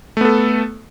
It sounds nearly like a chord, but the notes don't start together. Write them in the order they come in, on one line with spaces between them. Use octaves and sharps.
A3 B3 A4